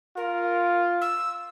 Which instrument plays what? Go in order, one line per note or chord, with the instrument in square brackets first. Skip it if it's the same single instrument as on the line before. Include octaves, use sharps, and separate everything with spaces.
[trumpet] F4 [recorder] A#4
[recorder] E6